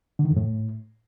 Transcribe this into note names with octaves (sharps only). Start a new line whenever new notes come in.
D3
D#3
F2
A2